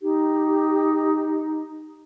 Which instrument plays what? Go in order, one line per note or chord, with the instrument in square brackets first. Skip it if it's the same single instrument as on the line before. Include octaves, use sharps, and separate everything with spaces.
[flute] D#4 [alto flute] G4